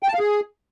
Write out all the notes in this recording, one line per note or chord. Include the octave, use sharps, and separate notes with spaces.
G5
A5
F5
G#4